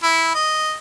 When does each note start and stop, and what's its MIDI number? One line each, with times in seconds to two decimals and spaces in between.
0.03 0.34 64
0.35 0.74 75